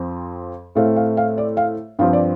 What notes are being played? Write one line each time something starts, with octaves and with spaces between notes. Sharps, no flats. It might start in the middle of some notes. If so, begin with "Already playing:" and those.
Already playing: F2 F3 C4
A2 A3 C4 F5
F5
F5
D5
F5
G2 F3 C4 F5
D5